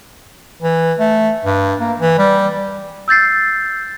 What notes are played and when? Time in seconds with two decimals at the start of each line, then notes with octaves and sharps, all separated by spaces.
0.62 E3
0.99 A3
1.45 G2
1.80 A#3
2.00 E3
2.18 G3
3.08 E6 G6 A6 C7